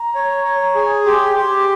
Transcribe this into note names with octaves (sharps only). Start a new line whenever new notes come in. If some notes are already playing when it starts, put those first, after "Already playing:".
Already playing: A#5
C#5
C#5
G#4
G4 C6
G4